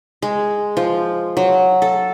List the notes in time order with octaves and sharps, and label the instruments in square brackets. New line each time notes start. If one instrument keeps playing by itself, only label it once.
[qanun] G#3
F3
F#3
A4